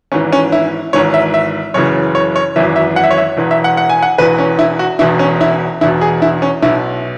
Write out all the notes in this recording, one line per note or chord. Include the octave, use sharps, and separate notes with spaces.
G#1 G#2 E3 C#4
C#4
E4
G#1 G#2 E3 C#5
E5
E5
F#1 F#2 C#3 E3 C#5
C#5
C#5
G#1 F#2 E3 E5
E5
F#5
E5
C#5
E5
E1 E2 E3
E5
F#5
F#5
G#5
F#5
E1 E2 E3 B4
C#4
E4
F#4
E1 E2 B2 E4
C#4
E4
E1 E2 B2 E4
G#4
E4
C#4
B1 B2 E4